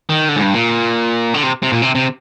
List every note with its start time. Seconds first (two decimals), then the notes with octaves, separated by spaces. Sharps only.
0.09 D#3
0.29 D3
0.36 G#2
0.42 G2
0.54 A#2
1.34 D3
1.43 C3
1.63 C3
1.72 A#2
1.82 C3
1.95 C3